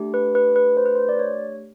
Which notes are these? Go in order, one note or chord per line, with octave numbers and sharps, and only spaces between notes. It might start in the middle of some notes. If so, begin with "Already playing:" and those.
Already playing: A3 D4 G4
B4
B4
B4
C5
B4
C5
D5
C#5